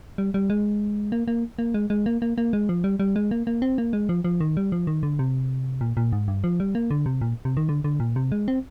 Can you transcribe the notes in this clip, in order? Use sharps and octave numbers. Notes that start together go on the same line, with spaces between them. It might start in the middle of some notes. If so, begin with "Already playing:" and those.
G3
G3
G#3
A#3
A#3
A#3
G#3
G#3
A#3
A#3
A#3
G#3
F3
G3
G3
G#3
A#3
A#3
C4
A#3
G#3
F3
F3
D#3
G3
F3
D#3
D3
C3
A#2
A#2
G#2
G2
F3
G3
A#3
D3
C3
A#2
C3
D#3
D3
D3
A#2
C3
G#3
C4